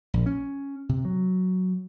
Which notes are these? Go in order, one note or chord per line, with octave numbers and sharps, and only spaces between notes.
A#1
C#4
C3
F#3